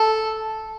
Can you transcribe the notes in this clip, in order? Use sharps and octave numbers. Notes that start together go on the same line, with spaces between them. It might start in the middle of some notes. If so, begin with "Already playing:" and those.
Already playing: A4